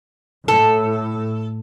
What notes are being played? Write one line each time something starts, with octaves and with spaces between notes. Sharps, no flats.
A2 A4